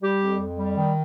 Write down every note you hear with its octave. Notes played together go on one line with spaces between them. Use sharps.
G3 G4
F2
F2
G3
D#3